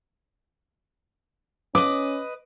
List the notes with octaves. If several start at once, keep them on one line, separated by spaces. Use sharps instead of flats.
C#4 B4 D#5 D6